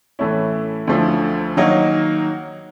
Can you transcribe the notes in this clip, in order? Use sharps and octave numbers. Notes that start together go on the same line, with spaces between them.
A2 E3 A3 C#4 E4
D2 D3 F3 A3
D#3 F#3 A#3 D#4 F#4